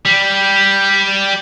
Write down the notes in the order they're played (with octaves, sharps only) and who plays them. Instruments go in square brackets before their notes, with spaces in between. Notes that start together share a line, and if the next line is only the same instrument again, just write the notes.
[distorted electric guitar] G3